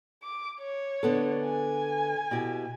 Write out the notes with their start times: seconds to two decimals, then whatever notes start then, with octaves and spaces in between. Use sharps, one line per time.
0.23 D6
0.61 C#5
1.03 D3 B3 A4
1.45 G#5
2.31 B2 E4 G4